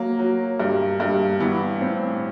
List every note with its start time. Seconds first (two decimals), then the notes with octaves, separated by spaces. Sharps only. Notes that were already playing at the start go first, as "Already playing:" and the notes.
Already playing: F#3 A#3
0.19 F#3
0.60 G2
1.00 G2
1.40 E3 B3
1.81 A2 C4